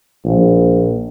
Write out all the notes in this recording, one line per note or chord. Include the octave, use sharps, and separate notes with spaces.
A#1